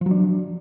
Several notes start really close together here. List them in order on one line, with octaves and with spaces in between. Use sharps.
F3 F#3 D4